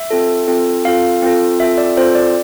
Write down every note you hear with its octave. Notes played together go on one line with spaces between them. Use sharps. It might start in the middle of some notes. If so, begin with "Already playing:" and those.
Already playing: E5
C4 F4 A4
C4 F4 A4
C4 F4 A4 F5
C4 F4 A4
C4 F4 A4 E5
D5
C4 F4 A4 C5
D5